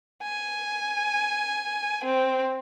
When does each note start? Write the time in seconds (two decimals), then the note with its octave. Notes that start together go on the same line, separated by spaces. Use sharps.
0.23 G#5
2.05 C4